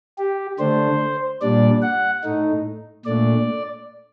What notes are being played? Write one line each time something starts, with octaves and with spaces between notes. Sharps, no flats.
G4
D3 A3 D4 C5
A#2 G3 D4 D5
F#5
A2 A3 D#4
A#2 A3 D4 D5